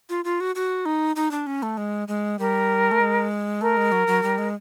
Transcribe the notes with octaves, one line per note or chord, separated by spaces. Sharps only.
F4
F4
F#4
F#4
D#4
D#4
D4
C#4
A3
G#3
G#3
G3 A#4
A3
G#3
A3 A#4
G#3
F#3
F#3
G3
G#3